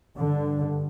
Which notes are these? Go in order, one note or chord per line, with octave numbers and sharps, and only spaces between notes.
G2 D3